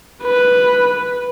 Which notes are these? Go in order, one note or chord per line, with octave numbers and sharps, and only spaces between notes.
B4